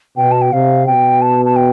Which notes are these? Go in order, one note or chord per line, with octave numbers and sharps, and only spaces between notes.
B2 G5
A5
G5
C3 F5
B2 G5
A5
A5
G5